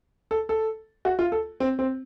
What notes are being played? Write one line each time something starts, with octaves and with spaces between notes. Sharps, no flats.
A4
A4
F#4
F4
A4
C4
C4